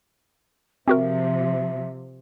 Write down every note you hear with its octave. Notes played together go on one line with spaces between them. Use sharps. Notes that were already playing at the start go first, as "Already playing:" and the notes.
C3 F3 C4 F#4 A#4 E5